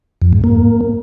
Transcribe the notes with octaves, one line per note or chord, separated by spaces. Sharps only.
F2
G#2
A#3